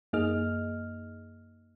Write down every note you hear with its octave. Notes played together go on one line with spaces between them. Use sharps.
F#2 A#3 D#4 G#4 D#5 F6